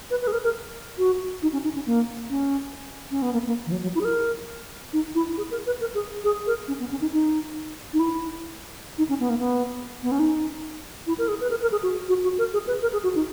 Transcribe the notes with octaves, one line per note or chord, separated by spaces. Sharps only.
B4
B4
G#4
A#4
A#4
F#4
D#4
C#4
D#4
C#4
A#3
C#4
C#4
B3
A#3
A#3
E3
F#3
F#3
E4
G#4
A#4
D#4
E4
G#4
A#4
B4
A#4
G#4
G#4
A#4
C#4
B3
C#4
D#4
D#4
D#4
E4
D#4
C#4
B3
A#3
B3
B3
C#4
D#4
E4
A#4
G#4
B4
A#4
A#4
G#4
F#4
F#4
F#4
A#4
G#4
B4
A#4
G#4
F#4
D#4